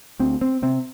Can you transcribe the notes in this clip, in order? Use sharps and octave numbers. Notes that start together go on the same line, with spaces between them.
D2 C4
C4
C3 C4